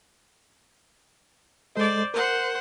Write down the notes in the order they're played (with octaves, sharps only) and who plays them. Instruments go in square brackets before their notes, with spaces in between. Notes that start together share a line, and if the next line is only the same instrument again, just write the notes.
[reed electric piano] G#3 A4 D#5 [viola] C5 D5
[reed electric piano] A#4 [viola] C5 F#5